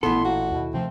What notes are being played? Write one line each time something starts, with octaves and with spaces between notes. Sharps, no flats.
A1 A#2 B3 E4 A4 C6
A#3 F#4
D#2 B2
C3 D#3 F3 A3 C4